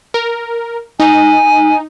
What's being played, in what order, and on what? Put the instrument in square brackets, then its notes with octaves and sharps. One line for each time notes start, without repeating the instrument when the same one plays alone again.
[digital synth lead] A#4
[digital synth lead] D#4 [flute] G#5